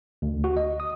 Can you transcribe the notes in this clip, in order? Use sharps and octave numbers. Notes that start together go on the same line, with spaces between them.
D2
F#4
D#5
D#6